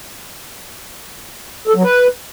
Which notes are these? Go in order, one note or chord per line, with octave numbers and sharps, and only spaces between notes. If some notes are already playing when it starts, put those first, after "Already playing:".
A4
F#3
B4